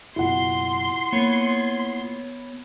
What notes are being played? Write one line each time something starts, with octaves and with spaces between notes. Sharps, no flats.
F#1 B2 E4 F4 F#5 C6
A#3 B3 C#5